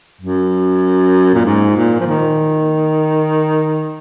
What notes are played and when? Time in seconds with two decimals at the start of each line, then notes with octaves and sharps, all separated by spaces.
0.21 F#2
1.34 A#2
1.45 G#2
1.76 A#2
2.00 F3
2.06 D#3